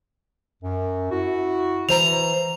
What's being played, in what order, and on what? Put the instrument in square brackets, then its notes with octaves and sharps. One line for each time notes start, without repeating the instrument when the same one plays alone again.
[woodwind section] F#2
E4 F#4
[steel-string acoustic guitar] E3 C5 A#5 [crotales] F7